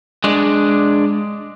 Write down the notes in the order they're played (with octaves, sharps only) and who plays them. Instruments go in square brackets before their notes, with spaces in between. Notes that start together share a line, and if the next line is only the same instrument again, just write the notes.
[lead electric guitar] G#3 D4